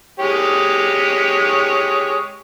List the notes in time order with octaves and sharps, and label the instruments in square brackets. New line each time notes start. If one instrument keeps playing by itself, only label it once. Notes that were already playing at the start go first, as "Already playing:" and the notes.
[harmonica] G#3 G4 C#5